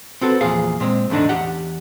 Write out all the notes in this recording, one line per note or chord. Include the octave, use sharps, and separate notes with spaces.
C4 F#4 A4 B4
E2 A#2 F3 G#4 F5
A#2 G#3 C4
E2 A2 D3 D4 D#4
E2 G4 F#5 A5